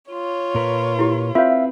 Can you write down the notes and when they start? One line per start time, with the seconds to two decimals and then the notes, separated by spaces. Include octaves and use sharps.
0.12 F4 C#5
0.55 A#2 A#4 B4
0.99 E4 G4
1.35 C4 F4 B4 C#5 E5 F5